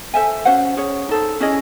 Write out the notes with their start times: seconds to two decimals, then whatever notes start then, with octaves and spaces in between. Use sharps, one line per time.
0.14 A4 C5 E5 G#5
0.45 C#4 F#4 C5 F#5
0.77 C#4 G#4 C#5
1.09 D#4 A4 C5
1.40 C#4 E4 G#4 D#5